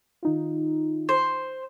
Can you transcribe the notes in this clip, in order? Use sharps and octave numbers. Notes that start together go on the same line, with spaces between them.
D#3 D#4 F4
C5